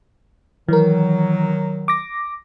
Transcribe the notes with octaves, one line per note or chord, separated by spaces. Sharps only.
D#3 E3 F#3 A#4
D6 A#6